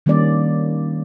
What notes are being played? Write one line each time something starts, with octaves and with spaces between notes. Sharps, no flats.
D#3 G3 A#3 C#4 D5